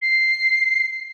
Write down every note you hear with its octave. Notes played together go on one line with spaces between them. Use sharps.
C7